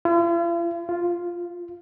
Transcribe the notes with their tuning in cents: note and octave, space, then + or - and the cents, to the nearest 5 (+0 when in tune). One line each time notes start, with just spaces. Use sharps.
F4 -45
F4 +0